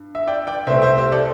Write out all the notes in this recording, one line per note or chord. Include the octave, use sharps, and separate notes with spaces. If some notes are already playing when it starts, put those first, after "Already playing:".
Already playing: G2
E5
D5 G5
D5 G5
C2 C3 A3 C4 C5 E5
C5 E5
G4 C5
A4 D5